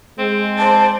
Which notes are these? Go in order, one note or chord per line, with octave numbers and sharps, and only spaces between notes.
G#3 C4
C5 D5 A5